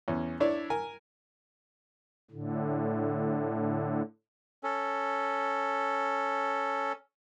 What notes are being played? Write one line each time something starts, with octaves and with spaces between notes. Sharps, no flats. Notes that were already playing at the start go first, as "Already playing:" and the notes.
E2 C#4
D4 E4 C#5 D5
A#4 G#5
A2 D3
C#4 A4